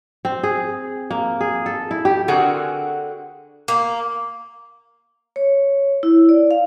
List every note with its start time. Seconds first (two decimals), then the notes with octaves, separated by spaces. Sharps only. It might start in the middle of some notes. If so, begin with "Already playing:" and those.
0.25 C4
0.43 G#4
1.11 A#3
1.41 G#4
1.66 A4
1.91 E4
2.05 G4
2.28 D3 C4 F#4 G#4 A#4
3.68 A#3
5.36 C#5
6.03 E4
6.29 D5
6.51 F5